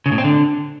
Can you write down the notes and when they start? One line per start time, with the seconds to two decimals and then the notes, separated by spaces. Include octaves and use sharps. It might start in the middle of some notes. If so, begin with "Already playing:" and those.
0.06 C#3
0.12 A2
0.18 C4
0.24 D3